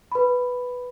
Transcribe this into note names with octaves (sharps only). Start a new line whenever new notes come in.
B4 B5